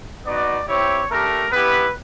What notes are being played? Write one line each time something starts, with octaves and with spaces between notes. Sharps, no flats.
B3 D#4 F#4 D5
C4 E4 G4 C#5
A3 D4 G4 A#4
B3 E4 G4 B4